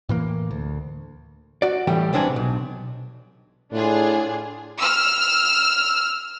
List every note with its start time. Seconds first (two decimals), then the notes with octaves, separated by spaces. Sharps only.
0.09 A2 E3 A#3
0.51 D2
1.62 F#4 D5
1.87 A2 E3 G3 G5
2.13 C2 B3 C4 D4 D5 G#5
2.36 B1
3.73 A2 D4 F4 G#4
4.79 E6 F6